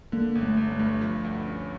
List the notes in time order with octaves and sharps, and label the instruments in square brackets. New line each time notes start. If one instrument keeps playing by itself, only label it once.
[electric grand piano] D3 [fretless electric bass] A#3
[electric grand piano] G1
[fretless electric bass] A3
[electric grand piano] G1
[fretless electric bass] A3
[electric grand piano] G2
F3
D2
C#4